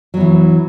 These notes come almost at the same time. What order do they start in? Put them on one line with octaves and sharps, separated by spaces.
F#3 B3 E3